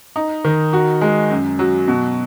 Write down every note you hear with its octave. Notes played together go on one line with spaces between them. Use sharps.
D#4
D#3
F#4
G#3
F#2
F#3
B2